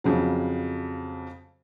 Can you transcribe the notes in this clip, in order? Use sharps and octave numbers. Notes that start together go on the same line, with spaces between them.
F2 C#3 F#3